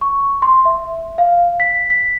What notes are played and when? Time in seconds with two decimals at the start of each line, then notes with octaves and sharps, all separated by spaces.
0.01 C#6
0.42 C6
0.65 E5
1.18 F5
1.60 B6
1.90 B6